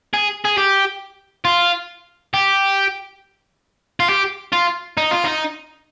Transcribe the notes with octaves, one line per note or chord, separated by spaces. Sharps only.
G#4
G#4
G4
F4
G4
F4
G4
F4
D#4
F4
D#4